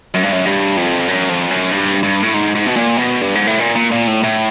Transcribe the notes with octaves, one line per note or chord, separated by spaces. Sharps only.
F#2
G2
F#2
G2
F2
F#2
F2
F#2
G2
G2
A2
G#2
G#2
B2
A#2
B2
G2
G#2
A2
A#2
A#2
A#2
A2
A2